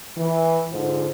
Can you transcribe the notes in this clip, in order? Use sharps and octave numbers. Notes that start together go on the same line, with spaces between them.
E3
G#2 D3 F4 C5